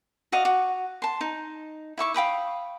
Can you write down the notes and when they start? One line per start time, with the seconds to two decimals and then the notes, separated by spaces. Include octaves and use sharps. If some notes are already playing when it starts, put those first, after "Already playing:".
0.32 F#4 D5 D#5 F5
0.45 F#4
1.02 A5 C6
1.21 D#4
1.97 E4 E5 C#6 D6
2.14 F5 G5 B5 D#6